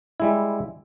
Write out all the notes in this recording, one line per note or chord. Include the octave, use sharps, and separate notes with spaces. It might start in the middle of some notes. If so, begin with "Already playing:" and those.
G3 G#3 E4